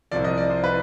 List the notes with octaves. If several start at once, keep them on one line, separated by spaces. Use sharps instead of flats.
C2 C3 F3 D5
D#5
D5
C5
B4